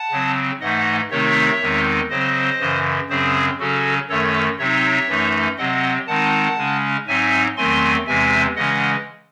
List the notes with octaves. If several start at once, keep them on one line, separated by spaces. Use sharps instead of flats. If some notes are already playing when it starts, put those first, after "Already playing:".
Already playing: F#5 A5
C#3 F#3 C4
G#2 E3 A3 D#4 D#5 F#5
C3 D#3 A3 C4 D#4 C#5 E5
E2 D#3 G#3 C4 D#4
C#3 F#3 C4 C5 D#5
F#2 C#3 E3
F#2 C#3 F#3 C4 G#4 C5
C#3 F#3 C#4 F#4 A4
F#2 D#3 A3 A4 C#5
C3 F#3 C4 D#4 C#5 E5
F#2 E3 A3 D#4
C3 F#3 C4 D#5 F#5
D#3 G#3 C4 D#4 F#5 A5
C#3 G#3 C#4
G#2 F#3 C4 D#4 E5 G#5
E2 D#3 F#3 A3 C4 G#5 C6
E2 C3 E3 G#3 C4 E5 G#5
C#3 E3 G#3 C#4 D#5 F#5